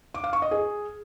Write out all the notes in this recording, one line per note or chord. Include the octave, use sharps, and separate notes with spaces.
D6
F5
C#6
D#5
G#4